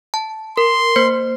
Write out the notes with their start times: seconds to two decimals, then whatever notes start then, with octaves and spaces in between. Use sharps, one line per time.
0.14 A5
0.57 A#4 C6
0.96 A#3 C5